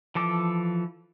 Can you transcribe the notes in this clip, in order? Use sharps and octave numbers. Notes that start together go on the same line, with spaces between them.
E3 F3 A4 D6